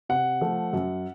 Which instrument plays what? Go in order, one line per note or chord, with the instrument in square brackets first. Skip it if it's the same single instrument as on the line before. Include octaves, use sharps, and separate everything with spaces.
[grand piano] C3 F#5
F3 A3
F#2